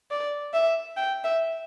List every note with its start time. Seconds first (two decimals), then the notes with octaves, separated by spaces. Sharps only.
0.11 D5
0.54 E5
0.97 G5
1.24 E5